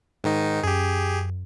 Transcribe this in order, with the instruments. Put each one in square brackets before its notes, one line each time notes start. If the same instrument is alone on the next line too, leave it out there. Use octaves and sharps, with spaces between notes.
[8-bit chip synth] G#2 D#3 D#4
[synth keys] F#2 [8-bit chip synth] G4 G#4